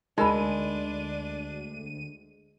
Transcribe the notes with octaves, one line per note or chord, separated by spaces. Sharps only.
D2 G#3 D4 D#4 A#4 B5 D#7